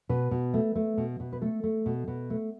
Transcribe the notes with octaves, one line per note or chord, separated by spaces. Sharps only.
B2 B4
B2
A3
A3
B2
B2
B4
A3 A4
A3
B2
B2
A3